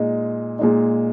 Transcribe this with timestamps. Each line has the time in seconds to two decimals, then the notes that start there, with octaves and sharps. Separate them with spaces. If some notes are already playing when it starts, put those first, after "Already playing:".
Already playing: A#2 G#3 D#4
0.59 A#2 G#3 D#4